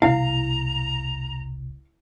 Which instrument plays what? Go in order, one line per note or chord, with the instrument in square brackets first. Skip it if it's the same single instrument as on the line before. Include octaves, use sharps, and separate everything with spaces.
[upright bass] E1 C2 [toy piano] E4 [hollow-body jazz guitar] F5 [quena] A#5